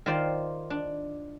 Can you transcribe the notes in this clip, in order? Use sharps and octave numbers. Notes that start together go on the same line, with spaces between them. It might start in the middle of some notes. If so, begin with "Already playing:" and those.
D#3 F4 C5 D5
D4